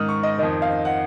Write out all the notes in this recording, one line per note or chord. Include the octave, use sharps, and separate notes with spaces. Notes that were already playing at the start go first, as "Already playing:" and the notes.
Already playing: G#2 D#3 D#6 F6
C#6
D#5
F2 D#3 D#5
F5
F#5